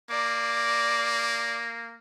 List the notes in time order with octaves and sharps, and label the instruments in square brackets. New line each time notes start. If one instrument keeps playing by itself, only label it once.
[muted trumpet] A#3 [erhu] D5